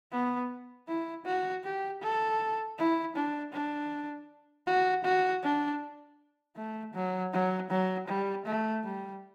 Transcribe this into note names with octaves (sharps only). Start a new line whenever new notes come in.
B3
E4
F#4
G4
A4
E4
D4
D4
F#4
F#4
D4
A3
F#3
F#3
F#3
G3
A3
G3